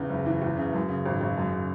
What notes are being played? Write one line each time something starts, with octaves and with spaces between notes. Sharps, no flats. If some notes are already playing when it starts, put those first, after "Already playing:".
Already playing: E2 C#3
F#1
E3
E2
C#3
F#2
C#3
G#1
G#1
F#2
C#3